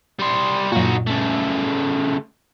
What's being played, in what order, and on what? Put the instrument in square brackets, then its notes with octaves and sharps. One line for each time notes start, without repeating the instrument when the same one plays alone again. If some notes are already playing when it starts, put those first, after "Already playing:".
[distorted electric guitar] G3 C6
[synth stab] F#2 A#2 [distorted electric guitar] D#4 F#4
[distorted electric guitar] C#3 A3